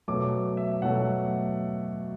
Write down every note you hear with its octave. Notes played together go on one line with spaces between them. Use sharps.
B2 F#3 A3 D6
E5
B2 F#3 A3 F#5